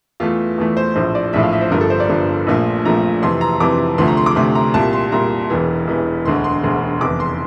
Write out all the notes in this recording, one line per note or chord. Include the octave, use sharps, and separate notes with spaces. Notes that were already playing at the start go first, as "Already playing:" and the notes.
E2 E3 A3 F4
E2 E3 A3
C5
A#1 A2 F3 C5
D5
A#1 A2 F3 E5
F5
E5
C5
G1 G2 F3 A#4
A4
C5
D5
G1 G2 F3
A#1 A#2 F3 A3
A#1 A#2 F3 A3 A#5
F2 C3 E3 C6
A#5
F2 C3 E3 D6
D2 C3 F3 A3 C6
A#5
C6
D6
D2 C3 F3 A3 C6
A#5
C2 A#2 G3 A5
C6
C2 A#2 G3 A#5
E1 E2 E3
E1 E2 E3
E1 D2 D3 C6
C6
E1 D2 D3
F1 E2 E3 D6
C6